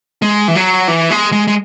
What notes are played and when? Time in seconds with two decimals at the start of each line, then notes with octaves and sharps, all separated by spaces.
0.22 G#3
0.48 E3
0.55 F#3
0.88 E3
1.11 G#3
1.32 G#3
1.47 G#3